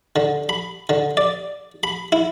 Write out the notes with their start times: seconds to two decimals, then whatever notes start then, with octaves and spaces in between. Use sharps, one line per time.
0.16 D3
0.49 B5
0.89 D3
1.17 D5
1.83 B5
2.12 E4